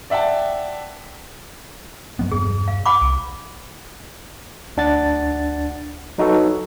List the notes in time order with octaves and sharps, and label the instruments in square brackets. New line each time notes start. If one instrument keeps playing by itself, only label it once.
[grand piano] D5 E5 F#5 G5 A5
[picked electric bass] G2 F#3 B3
[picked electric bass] E1 G2 [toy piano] G#4
[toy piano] F5
F#5 B5 D6
[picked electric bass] C2
[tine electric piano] D2 D4 F#5 A6
F#3 D#4 F#4 A4 B4